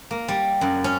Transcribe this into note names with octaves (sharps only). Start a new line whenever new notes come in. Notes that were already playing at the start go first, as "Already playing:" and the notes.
A#3
G3
F#2
C#4